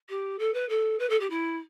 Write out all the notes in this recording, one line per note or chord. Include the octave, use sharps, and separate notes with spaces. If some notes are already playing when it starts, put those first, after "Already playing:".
G4
A4
B4
A4
B4
A4
G4
E4